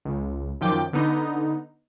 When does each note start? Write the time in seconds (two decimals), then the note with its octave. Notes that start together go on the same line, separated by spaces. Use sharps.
0.05 C#2
0.61 F#2 D#3 F3 G5 D6
0.93 D3 B3 D#4